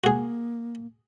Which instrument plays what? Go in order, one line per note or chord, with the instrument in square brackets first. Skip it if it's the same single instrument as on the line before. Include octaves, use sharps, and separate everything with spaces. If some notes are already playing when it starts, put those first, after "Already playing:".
[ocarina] A#3 [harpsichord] F#4 G#4